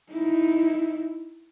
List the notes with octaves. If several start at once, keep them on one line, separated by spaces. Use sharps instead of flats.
D#4 E4